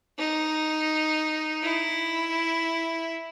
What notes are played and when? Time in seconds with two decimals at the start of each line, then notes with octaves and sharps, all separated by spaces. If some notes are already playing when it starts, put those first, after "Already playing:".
0.18 D#4
1.63 E4